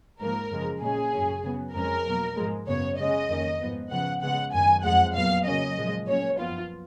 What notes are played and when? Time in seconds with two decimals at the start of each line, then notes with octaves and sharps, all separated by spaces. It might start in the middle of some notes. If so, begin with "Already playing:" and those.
0.20 G#2 F3 A#3 A#4
0.50 F#2 C#3 F3 G#3
0.81 A#2 G#3 C#4 G#4
1.13 F#2 C#3 F#3 C#4
1.43 C#3 F#3 B3
1.74 F2 F3 G#3 C#4 A#4
2.05 B2 F#3 A#3
2.36 G#2 F3 G#3
2.67 F#2 C#3 F#3 B3 C#5
2.98 C#3 G#3 C#4 D#5
3.29 F2 D#3 A#3 C#4
3.60 G#2 F3 B3
3.91 C#3 F3 B3 F#5
4.22 C#3 G#3 B3 F#5
4.53 F#2 D#3 F#3 G#5
4.84 F2 F3 G#3 F#5
5.15 A#2 F#3 B3 F5
5.46 C#3 F#3 A#3 C#4 D#5
5.77 A#2 F3 G#3
6.08 A#2 F#3 C#4 C#5
6.39 F#2 F3 B3 F4